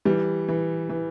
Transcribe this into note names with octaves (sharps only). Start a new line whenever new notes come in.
E3 G3
E3
E3